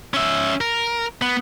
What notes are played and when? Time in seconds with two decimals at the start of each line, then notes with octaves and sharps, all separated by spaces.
0.14 C#4 E5
0.61 A#4
1.22 B3